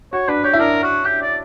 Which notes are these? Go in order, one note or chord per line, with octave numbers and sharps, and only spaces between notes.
F#4 C#5
D4 B4
G4 C#5
E4
D4 A#4
F#4
G4
D5